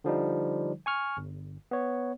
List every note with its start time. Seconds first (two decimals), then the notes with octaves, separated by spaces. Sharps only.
0.04 D3 F3 G3 D#4
0.86 G#5 C#6 F6
1.17 G1
1.71 B3 C#5